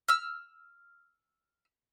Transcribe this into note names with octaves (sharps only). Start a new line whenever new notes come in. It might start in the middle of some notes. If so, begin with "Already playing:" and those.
E6 F6